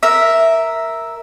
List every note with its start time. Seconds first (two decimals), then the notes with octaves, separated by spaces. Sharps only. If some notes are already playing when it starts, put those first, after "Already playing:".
0.03 A#4 E5